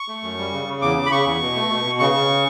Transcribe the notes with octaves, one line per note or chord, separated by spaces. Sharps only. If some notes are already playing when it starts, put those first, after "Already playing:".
Already playing: C#6
A3
F#2
G3
C#3
C#3
E2 D6
C#3
B5
C#3 C#6
E2
B2
A3
B2
B2
C#3 C#6
C#3